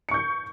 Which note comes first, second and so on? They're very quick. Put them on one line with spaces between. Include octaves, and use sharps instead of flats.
C#7 C#6 G6